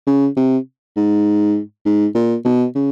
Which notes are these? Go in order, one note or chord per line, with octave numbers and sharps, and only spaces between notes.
C#3
C3
G#2
G#2
A#2
B2
C#3